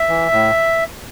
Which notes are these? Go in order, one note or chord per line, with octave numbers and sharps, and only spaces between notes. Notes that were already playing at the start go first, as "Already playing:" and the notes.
Already playing: E5
E3
A2